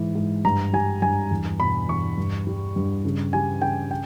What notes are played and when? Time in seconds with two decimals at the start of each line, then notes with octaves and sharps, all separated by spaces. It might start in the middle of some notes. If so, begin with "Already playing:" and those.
Already playing: G#2 E3
0.15 G#2
0.45 G2 A#5
0.73 G3 G#5
1.02 G2 G#5
1.31 E2
1.60 B2 B5
1.88 E2 C#6
2.18 G2
2.47 G3
2.76 G2
3.05 C#3
3.33 G3 G#5
3.62 C#3 G5
3.91 G5